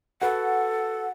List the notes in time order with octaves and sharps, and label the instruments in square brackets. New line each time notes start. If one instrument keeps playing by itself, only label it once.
[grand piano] F#4 B4 [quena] A4 [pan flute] F#5